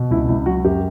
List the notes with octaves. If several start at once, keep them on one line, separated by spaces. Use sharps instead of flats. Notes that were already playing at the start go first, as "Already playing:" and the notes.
Already playing: B2
C#2 E4
C#2 E4
F#3 F#4
F#2 G4